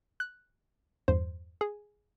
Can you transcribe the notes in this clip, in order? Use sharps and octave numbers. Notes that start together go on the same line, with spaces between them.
F#6
E2 G2 C5
G#4